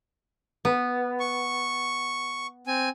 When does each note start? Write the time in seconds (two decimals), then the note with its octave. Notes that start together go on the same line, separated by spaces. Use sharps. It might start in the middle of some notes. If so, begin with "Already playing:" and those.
0.65 B3
1.20 C#6
2.67 C4 G#5